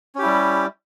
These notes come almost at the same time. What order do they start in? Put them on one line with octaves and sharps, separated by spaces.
C#4 G4 E4 G3